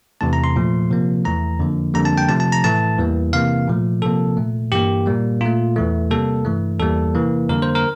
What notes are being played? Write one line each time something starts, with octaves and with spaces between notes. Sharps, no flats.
E2 C3 E3 A3 A5
A#5
C6
A#2 F3 A3
C3 F3 A#3
E2 E3 A3 A#5
F2 D3 F3 A#3
F2 D3 G3 A#3 A#5
A5
G5
C3 F3 A3 A5
A5
A#5
A2 E3 A3 A5
E2 E3 G3 A#3
C3 E3 A#3 F5
A#2 F3 A3
C3 F3 A#3 A4
A#2 A3
G2 E3 A#3 G4
A#2 G3 A#3
A#2 A3 F4
E2 E3 A3
C3 G3 A#3 A4
G2 E3 A3
E2 E3 G3 A#3 A4
C3 E3 A#3
F2 D3 G3 A#3 A#4
C5
A#4